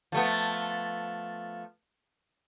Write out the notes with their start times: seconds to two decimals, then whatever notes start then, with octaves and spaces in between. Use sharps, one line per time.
0.12 F3 A3 B3